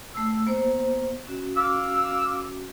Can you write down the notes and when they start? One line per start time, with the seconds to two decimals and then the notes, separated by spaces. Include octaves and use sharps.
0.14 A3 E6
0.47 A#3 B3 C5
1.27 C#4 F#4
1.57 F5 D6 E6